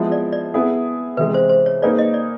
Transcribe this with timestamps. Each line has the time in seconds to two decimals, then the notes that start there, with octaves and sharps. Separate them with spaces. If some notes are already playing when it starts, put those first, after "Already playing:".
Already playing: F3 G#3 B3 E4
0.12 D5
0.33 D5
0.54 B3 E4 G#4
1.17 C3 E3 G#3 B4
1.34 C5
1.49 C5
1.66 C#5
1.82 A#3 D#4 G#4 B4 D5
1.98 D#5
2.14 D5